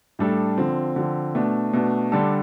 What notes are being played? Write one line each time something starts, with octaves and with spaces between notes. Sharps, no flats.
A2 G3 D4 A4
D3 F3 C4
D3 F3 C4
B2 A3 D4
B2 A3 D4
D3 G3 D4 A4